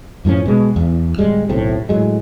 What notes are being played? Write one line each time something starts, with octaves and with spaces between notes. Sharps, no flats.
F#2 A2 F3 C#4
B2 G#3
E2
D1 G3 G#3
D1 B1 A2 C3
A2 F#3 G#3